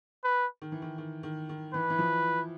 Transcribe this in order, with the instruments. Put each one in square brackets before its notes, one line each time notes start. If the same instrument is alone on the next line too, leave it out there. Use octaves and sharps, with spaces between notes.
[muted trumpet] B4
[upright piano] D#3
E3
D#3
D#3
D#3
D#3
[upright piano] E3 [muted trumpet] B4
[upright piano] E3
F3